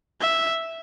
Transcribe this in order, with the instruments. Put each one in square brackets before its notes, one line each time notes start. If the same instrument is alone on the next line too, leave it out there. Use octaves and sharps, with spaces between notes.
[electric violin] E5